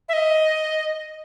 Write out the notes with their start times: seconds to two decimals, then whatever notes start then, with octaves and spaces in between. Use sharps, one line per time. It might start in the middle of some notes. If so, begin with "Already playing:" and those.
0.09 E5
0.13 D#5